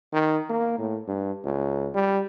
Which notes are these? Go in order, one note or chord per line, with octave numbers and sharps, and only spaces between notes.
D#3
A#3
A2
G2
C#2
G3